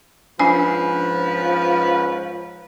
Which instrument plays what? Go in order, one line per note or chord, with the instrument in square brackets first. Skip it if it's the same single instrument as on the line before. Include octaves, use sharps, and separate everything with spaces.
[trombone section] G#2 C#4 B4 [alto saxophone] F3 [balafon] D4 G#5